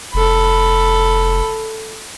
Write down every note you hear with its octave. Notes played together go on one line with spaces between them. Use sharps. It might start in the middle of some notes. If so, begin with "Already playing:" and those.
F1 A4 B5